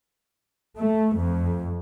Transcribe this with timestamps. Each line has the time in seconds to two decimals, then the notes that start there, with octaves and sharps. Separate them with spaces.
0.78 A3
1.15 F2